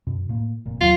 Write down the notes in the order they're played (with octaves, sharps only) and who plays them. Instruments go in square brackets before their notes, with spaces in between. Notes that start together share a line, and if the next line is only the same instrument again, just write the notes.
[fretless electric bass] F#2 B2
A2 A#3
F1 A#2
[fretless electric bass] D#2 F#3 B3 [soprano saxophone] F4